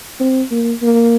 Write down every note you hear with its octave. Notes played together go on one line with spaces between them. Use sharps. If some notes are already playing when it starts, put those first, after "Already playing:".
C4
A#3
A#3